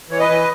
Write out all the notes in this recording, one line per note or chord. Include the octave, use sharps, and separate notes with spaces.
E3 C#5
B4 D#5
E3